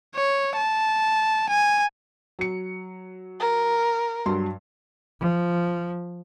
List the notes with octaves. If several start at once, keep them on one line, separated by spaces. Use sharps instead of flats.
C#5
A5
G#5
F#3 C#7
A#4
G2 F#3 C6
F3